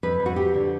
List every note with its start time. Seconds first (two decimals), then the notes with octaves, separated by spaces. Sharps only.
0.03 F2 B4
0.20 F2
0.26 F#4
0.36 F3 G4
0.54 D3